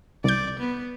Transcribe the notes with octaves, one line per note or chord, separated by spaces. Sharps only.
C2 D5 G6
B3